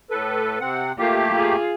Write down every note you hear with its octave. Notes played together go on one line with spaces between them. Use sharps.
A2 A4 B4
C3 C4 F#5
A3 A#3 F4 G4
F4 G#4